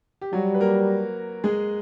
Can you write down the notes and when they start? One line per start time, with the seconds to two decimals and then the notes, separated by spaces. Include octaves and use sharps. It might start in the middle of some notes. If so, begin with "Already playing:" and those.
0.21 G4
0.33 F#3 G3 F#4
0.54 B4
0.60 A#3 A#4
1.44 G#3 G#4